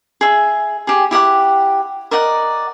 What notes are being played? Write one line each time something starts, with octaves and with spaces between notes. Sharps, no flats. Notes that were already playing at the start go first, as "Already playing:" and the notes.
G#4 E5
G4 G#4
E4 G4 F#5 D6
A#4 D5 D#5 F#5